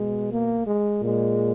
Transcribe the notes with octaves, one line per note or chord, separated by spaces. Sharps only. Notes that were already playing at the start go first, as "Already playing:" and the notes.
Already playing: B2 G#3
A#3
G#3
A#2 G#3